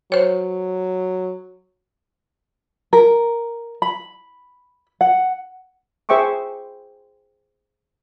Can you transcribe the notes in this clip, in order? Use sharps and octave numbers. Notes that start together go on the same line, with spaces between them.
F#3 C5 C#5
A#4
B5
F#5
G#4 C5 E5 G5 C#6 D6